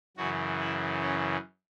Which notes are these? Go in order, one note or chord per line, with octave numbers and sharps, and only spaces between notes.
F#2 C#3 E3 F#4
E4
C#4